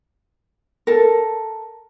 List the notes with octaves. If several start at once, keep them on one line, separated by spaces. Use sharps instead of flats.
A4 A#4